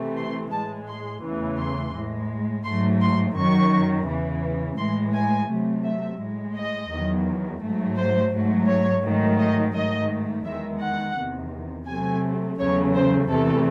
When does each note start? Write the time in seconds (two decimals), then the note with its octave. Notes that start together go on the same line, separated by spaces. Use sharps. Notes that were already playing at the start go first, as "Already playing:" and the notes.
Already playing: C3 E3 A3
0.17 C6
0.52 A2 G#3 A5
0.87 C6
1.23 E2 C#3 E3 A3
1.58 C6
1.94 A2 G#3
2.64 G#2 F#3 A3 C6
3.01 C6
3.36 F#2 D#3 F#3 C#6
4.07 E2 C#3 E3
4.78 A2 E3 G#3 C6
5.13 G#5
5.49 C3 F#3 A3
5.84 E5
6.20 A2 G#3
6.56 D#5
6.90 E2 D#3 F#3
7.62 G#2 F#3 A3
7.97 C5
8.32 G#2 F#3 A3
8.68 C#5
9.04 G#2 D#3 F#3 A3
9.39 D#5
9.74 G#2 D#3 F#3 A3 D#5
10.45 E2 D#3 G#3 E5
10.81 F#5
11.17 E2 C3 D#3
11.87 C3 F#3 A3 G#5
12.59 E2 C#3 F#3 A3 C#5
12.94 C5
13.29 E2 C3 E3 A3 A4